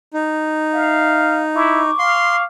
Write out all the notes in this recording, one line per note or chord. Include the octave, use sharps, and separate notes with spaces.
D#4
E5 F5
E4 C#6 D6
F5 C6